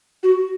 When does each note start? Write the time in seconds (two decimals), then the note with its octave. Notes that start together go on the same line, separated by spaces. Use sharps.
0.23 F#4